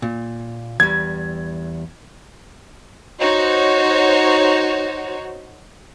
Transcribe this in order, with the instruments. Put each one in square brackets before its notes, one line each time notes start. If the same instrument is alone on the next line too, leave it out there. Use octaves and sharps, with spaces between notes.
[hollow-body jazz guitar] A#2
[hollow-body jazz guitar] E2 G3 [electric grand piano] G#6
[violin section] D#4 F#4 C5 C#5